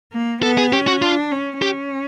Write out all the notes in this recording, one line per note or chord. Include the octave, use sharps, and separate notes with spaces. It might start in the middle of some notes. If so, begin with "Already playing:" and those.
A#3
B3 A4
G#4
C#4 G4
F#4
D4 F4
C#4
C#4 G4